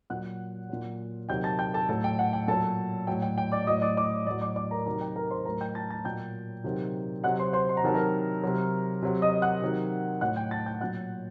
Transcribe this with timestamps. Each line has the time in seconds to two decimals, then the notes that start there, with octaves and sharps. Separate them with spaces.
0.10 A#2 F#3 F#5 F#6
0.70 A#2 F#3
1.29 C3 D#3 F#3 G5 G6
1.44 A5 A6
1.59 G5 G6
1.74 A4 A5
1.89 A2 F#3 A4 A5
2.04 G5
2.19 F#5
2.33 G5
2.48 A#2 F#3 A4 A5
3.07 A2 F#3 G5
3.22 G5
3.38 G5
3.52 D5 D6
3.67 A2 F#3 D#5 D#6
3.82 D5 D6
3.97 D5 D6
4.26 A2 F#3 D5 D6
4.42 D5 D6
4.56 D5 D6
4.71 A#4 A#5
4.86 C3 D#3 F#3 A#4 A#5
5.01 G5
5.16 A#4 A#5
5.31 C5 C6
5.45 A2 F#3 A#4 A#5
5.61 G5 G6
5.75 A5 A6
5.90 A5 A6
6.05 A#2 F#3 G5 G6
6.64 C3 D#3 F#3
7.24 C3 F#3 F#5 F#6
7.39 C5 C6
7.53 C5 C6
7.69 C6
7.77 A#5
7.83 C3 D#3 F#3 A5
7.94 A#4 A#5
8.44 C3 F#3
9.02 C3 F#3
9.22 D#5 D#6
9.42 F#5 F#6
9.62 C3 D#3 F#3
10.21 A2 F#3 F#5 F#6
10.36 G5 G6
10.51 A5 A6
10.66 G5 G6
10.81 A#2 F#3 F#5 F#6